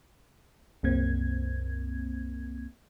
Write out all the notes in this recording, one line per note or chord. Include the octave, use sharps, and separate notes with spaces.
C2 F#2 A#3 C4 G#6